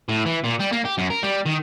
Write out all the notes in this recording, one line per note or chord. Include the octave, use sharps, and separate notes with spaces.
A2
E3
A#2
G3
A#3
G4
F#2
A#4
G3
D#3